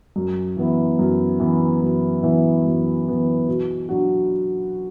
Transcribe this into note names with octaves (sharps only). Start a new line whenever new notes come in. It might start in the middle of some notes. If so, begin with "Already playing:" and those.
F#2
E3 B3 E4
F#2
E3 B3 E4
F#2
E3 B3 E4
F#2
E3 B3 E4
B2
F#3 D4 F#4